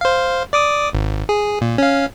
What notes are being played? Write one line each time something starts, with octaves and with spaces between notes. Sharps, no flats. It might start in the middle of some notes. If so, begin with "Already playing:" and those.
C5 F5
D5 D6 D#6
G#1
G#4
A#2
C#4 F5